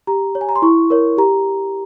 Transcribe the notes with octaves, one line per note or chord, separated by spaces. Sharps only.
G4 A#5
C#5
G#5
A#5
C6
E4 C#6
A#4 C#5
G4 A#5